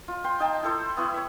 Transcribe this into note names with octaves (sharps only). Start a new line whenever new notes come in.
F4
G5 C6
D#4 G5 A5
E4 A4 C5
B3 E4 C#6
C#5 E5